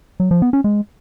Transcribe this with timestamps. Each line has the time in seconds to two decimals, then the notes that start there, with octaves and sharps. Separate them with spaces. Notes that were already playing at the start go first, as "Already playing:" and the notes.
0.20 F#3
0.31 F3
0.42 B3
0.53 C#4
0.64 G#3